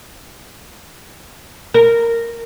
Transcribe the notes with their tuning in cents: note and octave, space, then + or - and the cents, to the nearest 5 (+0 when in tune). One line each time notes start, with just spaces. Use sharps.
A#4 -10